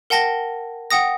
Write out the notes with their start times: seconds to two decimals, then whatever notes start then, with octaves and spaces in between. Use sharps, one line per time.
0.10 A#4 F#5 G5 A5 A#6 G7
0.91 F#5 G5 D#6 A#6